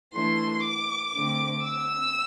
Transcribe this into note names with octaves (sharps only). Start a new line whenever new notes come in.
E3 A3 D4 C6
D6
D3 A3 C4
E6